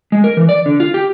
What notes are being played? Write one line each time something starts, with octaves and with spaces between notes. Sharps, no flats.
G#3
A#4
E3
D5
D3
F4
G4